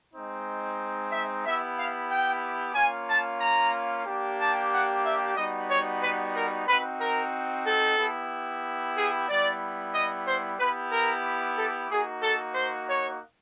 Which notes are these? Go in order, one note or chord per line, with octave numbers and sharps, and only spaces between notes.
G#3 C4 D#4
E5
B3 E4 G4 E5
F5
G5
A#3 C#4 F4 G#5
A5
A#5
A#3 D4 G4
A5
F#5
E5
G3 B3 D#4 F#4 D#5
C#5
B4
A#4
C4 D#4 F#4 B4
A#4
A4
B3 E4 G4
G#4
G3 B3 E4 D5
D#5
C5
B3 E4 G4 B4
A#4
A4
A#3 D#4 F#4 G#4
A4
C5
C#5